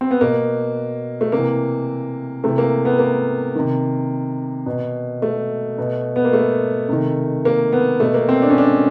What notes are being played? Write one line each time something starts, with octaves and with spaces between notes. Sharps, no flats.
C4
B3
B2 A#3
A3
C3 E3 A#3
C3 E3 A3
A#3
B3
A#3
C3 D#3
B2
A3
B2
B3
A#3
A3
C3 D#3
A#3
B3
B2 A3
A#3
C4
D4
C#4
D4